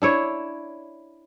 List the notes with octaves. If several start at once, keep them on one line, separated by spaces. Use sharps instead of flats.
D4 E4 C#5